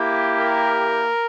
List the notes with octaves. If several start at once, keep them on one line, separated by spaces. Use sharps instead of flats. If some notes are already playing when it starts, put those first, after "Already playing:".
Already playing: A#3 E4 G4
A#4